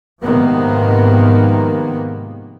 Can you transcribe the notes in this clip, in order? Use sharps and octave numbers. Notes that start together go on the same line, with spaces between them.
G#2 C3 D#3 F3 A#3 B3